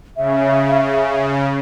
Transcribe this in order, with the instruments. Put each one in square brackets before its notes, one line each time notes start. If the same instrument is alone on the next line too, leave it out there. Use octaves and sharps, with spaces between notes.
[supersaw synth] C#3 [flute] E5